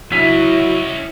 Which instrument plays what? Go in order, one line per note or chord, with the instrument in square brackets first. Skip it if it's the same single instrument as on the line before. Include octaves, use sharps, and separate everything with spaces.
[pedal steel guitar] F#3 [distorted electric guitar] C#4 D#5 [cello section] E4 [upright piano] B6